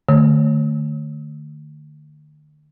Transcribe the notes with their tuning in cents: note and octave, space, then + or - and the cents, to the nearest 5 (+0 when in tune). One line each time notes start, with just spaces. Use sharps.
D3 +40 A3 +15